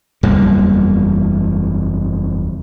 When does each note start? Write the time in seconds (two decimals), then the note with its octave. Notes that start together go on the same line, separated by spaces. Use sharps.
0.23 F#1 E2 G3 A#3